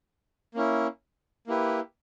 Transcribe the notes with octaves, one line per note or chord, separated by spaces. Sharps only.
A#3 C#4 E4
A#3 E4 G4 B4